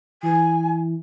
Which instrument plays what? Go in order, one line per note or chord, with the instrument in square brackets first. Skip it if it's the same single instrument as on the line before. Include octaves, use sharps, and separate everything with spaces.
[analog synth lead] E3 [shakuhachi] G#5